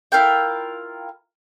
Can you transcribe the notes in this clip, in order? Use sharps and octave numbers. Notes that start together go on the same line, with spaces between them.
E4 F4 A#4 G5